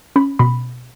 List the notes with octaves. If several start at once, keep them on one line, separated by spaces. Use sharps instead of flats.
C#4 B5
B2 B5